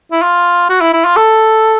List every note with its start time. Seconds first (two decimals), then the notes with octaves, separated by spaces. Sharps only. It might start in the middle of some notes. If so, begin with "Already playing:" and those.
0.12 E4
0.23 F4
0.70 F#4
0.81 E4
0.93 E4
1.05 F4
1.17 A4